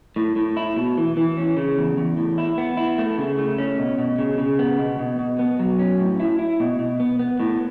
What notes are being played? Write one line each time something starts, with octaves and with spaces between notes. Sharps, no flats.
A2
A2
E4
B2
E3
E3
C#4
C#3
E2
E2
A2
E4
B3
E4
A3
C#3
A3
C#4
B2
B2
C#3
C#3
B3
B2
B2
B2
B3
F#3
C#4
A2
E4
E4
B2
B2
B3
B3
A2